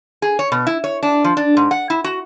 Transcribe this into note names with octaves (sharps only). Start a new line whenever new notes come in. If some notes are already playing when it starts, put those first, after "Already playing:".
G#4
C#5
B2
E4
C#5
D4
F3
D4
G#2
F#5
E4
F#4